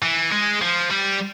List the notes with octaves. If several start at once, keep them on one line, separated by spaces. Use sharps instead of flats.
E3
G#3
F3
G3